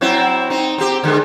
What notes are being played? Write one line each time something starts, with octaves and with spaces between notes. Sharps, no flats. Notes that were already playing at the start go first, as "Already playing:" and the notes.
F#3 C4 E4
C4 D#4
C4 G4
D3 G#3